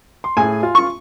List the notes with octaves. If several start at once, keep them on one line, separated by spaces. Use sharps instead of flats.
C6
A2 G#4 G#5
F4
C#6